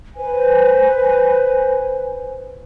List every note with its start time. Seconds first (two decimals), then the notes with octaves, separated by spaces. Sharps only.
0.16 B4 C5 G#5